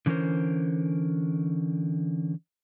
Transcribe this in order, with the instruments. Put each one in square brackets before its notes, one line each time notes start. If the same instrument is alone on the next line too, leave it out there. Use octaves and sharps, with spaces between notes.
[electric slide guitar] D3 E3 C#4 G#4 A#4 C5